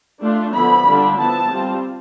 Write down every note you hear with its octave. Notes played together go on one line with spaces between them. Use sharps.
A3 D4 F4
D3 F3 B3 E4 B5
D3 G3 D4 F4
F3 B3 E4 A5
G3 C4 F4